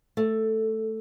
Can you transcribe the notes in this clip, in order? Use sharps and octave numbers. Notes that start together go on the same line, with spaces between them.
A3